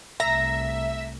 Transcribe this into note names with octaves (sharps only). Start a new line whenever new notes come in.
C2 A3 E5 A#5